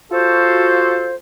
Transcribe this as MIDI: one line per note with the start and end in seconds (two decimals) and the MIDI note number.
0.12 1.15 65
0.12 1.15 66
0.12 1.15 69
0.12 1.15 72